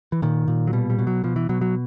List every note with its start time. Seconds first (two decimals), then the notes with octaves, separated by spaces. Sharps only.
0.12 E3
0.22 A#2 D#3
0.48 A#2
0.67 F#3
0.73 B2 G3
0.90 G3
0.99 B2
1.07 F#3
1.24 B2 F3
1.36 E3
1.49 B2 F#3
1.61 F#3